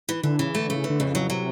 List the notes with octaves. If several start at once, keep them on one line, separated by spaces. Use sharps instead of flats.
E3
D3 E3
C#3 E3
D3 A3
C#3 A3
E3
D3
F2 C#3
F#3
C3 F#3